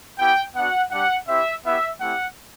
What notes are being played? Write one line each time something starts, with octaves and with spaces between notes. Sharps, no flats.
B3 E4 G4 G5
B3 D4 F#4 F#5
G3 D4 G4 F#5
C4 E4 G4 E5
B3 E4 G4 E5
A3 C4 E4 G4 F#5